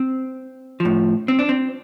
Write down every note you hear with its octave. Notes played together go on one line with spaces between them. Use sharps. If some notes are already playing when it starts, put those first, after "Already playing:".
Already playing: C4
F3
A2
C4
D4
C4